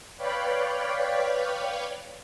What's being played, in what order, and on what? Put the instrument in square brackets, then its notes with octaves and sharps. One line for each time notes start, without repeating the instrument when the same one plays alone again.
[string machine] B4 C#5 D5 F5 G5 B5